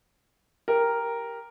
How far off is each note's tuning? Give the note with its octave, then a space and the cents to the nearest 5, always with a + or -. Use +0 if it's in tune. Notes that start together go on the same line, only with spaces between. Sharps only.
G4 +10 A#4 +0